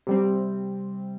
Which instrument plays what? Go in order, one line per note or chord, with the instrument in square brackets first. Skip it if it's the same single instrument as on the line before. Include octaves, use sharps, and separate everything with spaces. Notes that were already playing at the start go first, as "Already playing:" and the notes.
[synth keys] C3 G3 C4